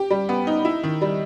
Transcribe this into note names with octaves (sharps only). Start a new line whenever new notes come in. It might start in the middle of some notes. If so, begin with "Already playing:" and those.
Already playing: G4
G3
B3
D#4
E4
D#3
G3